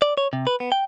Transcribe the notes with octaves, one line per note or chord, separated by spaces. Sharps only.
D5
C#5
C3
B4
B3
G5